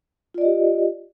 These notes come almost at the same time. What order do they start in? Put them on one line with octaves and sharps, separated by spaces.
F4 D5 D#5 G4